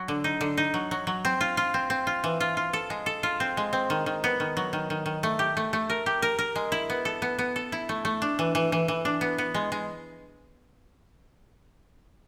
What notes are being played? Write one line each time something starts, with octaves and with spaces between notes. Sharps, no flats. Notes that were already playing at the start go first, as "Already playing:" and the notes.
Already playing: F#3
D3
D#4
D3
D#4
F#3
F#3
F#3
C4
F4
F4
C4
C4
F4
E3
F4
F4
A4
G#3
A4
F4
C4
G#3
C4
D#3
D#3
B3
D#3
F#3
D#3
D#3
D#3
A3
G4
A3
A3
A#4
G4
A#4
A#4
G#3
E4
B3
A4
B3
B3
A4
E4
A3
A3
D4
E3
E3
E3
E3
D4
B3
B3
G#3
G#3